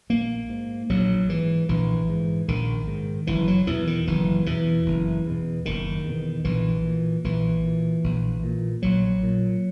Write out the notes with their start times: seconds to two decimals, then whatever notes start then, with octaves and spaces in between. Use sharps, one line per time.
0.09 A#1 A#3
0.49 G#2
0.89 A#1 F#3
1.29 G#2 E3
1.69 A#1 E3
2.09 G#2
2.48 A#1 D#3
2.87 G#2
3.27 F#1 E3
3.48 F#3
3.67 E2 B2 E3
3.87 D#3
4.07 F#1 E3
4.46 E2 B2 E3
4.86 F#1
5.26 E2 B2
5.66 F#1 D#3
6.05 E2 B2
6.44 A#1 E3
6.84 A#2
7.24 A#1 E3
7.64 A#2
8.04 A#1
8.43 A#2
8.82 A#1 F#3
9.23 A#2